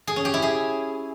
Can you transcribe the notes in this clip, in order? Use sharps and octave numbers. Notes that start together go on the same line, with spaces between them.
G#4
C#4
G4
E4
G#4